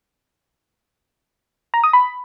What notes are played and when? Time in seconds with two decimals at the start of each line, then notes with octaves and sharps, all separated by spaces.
1.74 A#5
1.84 D#6
1.93 B5